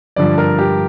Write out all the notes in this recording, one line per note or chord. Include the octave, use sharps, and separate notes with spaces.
G2 D3 F3 D5
A#4
G4